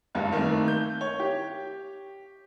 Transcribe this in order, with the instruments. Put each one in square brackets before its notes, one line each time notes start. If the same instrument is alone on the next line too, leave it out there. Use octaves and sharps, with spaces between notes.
[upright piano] F#1 C#2 G2
D#3 A3 A#3 C4
G6
C#5
G4